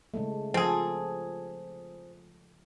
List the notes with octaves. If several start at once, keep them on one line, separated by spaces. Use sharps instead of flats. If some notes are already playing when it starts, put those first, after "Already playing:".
C#3 G#3 A3
F3 C4 G#4 A4